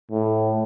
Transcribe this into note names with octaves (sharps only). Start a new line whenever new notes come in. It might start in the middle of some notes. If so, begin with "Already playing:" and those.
A2